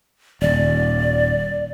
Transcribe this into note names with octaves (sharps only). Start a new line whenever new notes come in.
D#1 D5